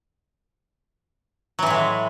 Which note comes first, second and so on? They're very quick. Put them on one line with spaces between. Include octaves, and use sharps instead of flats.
F#3 E3 A2 G#3